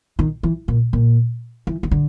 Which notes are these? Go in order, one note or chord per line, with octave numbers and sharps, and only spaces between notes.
D#3
E3
A#2
A#2
E3
D#3
D3